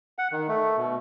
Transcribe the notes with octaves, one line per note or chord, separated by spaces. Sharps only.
F#5
D#3
A3
B2